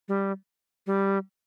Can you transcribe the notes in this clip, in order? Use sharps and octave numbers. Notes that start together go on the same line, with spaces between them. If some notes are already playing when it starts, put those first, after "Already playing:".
G3
G3